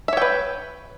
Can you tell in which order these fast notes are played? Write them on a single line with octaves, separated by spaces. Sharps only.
E5 C#5 G5 B4